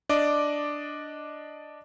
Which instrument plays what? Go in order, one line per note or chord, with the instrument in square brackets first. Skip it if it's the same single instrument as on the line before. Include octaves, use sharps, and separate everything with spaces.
[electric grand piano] D4 D5 D#5 D6